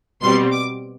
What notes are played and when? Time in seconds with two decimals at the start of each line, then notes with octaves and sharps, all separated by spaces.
0.22 B2 G3 C4 C6
0.53 D6